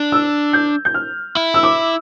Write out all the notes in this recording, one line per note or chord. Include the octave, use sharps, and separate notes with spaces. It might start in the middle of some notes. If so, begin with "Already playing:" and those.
Already playing: D4
E6
G6
G6
F6
E4
E6
D6